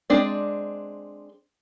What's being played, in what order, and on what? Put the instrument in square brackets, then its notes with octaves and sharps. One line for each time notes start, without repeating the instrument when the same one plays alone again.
[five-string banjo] G#3 C4 D4 D5